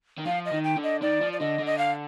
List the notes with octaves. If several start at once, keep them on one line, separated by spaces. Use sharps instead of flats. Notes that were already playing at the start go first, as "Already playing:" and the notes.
D#3
F3 F5
D#5
D#3
G5
D3
D#5
D#3 D5
F3
D5
D3 D#5
D3
D#5
F5